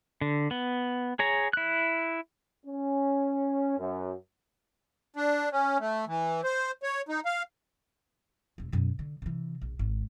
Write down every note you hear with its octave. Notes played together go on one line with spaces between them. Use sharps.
D3
B3
G#4 C#5 A#5
E4 F#6
C#4
F#2
D4
C#4
A3
E3
C5
C#5
D#4
F5
E1 C4
F#2 B2
D3
C3 E3
A#1
G#1